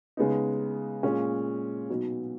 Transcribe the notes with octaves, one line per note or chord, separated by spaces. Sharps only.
C#3 G#3 B3 D#4
A#2 G#3 C#4 F4
B2 F#3 B3 D#4